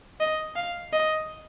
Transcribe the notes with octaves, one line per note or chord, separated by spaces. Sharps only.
D#5
F5
D#5